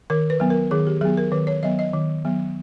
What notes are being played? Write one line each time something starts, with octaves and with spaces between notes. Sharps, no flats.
D#3 A#4
B4
F#3 B3
A#4
D#3 G#4
G4
F#3 B3 G#4
A#4
D#3 B4
C#5
F#3 B3 D#5
D#5
D#3
F#3 B3